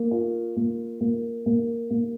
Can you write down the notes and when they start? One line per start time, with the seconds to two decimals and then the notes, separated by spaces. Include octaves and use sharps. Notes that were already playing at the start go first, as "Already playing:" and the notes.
Already playing: A#3
0.11 F4
0.57 A#3
1.01 A#3
1.46 A#3
1.91 A#3